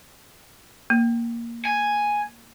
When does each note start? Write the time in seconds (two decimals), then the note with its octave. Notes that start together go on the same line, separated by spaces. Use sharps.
0.90 A#3
1.65 G#5